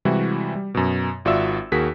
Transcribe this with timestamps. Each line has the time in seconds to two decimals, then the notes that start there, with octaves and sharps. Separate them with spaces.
0.05 C3 E3 G3 G#3 E4 F#4
0.55 G3
0.75 F#2 B2
1.25 G#1 F4 F#4 D5 E5 E6
1.72 D#2 F#4 G#4 A#4 B6